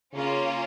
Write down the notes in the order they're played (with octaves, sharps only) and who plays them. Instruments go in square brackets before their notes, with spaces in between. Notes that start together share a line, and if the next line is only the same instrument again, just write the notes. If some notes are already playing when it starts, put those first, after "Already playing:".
[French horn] C#3 [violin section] A#3 C#4 F4